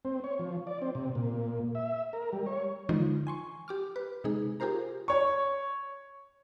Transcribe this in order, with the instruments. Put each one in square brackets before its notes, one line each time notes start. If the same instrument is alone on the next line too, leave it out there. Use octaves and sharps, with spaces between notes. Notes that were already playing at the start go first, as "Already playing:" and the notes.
[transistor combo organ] C4
C#5
F3
D5
C4
C3
A#2
E5
A#4
G3
C#5
[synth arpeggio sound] D3 E3 F3 G#3 D#4 F4
G#5 C6 C#6
G4 D6 F6
B4
C3 G#3 D#4 G#4
F4 G4 G#4 A#4 C5 A#5
[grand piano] C#5 C#6